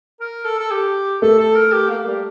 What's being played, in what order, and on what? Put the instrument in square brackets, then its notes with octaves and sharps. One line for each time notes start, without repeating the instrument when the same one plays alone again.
[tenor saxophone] A#4
A4
A4
G4
[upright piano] A3 [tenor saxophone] A4
[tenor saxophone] A4
A#4
G4
A#3
G3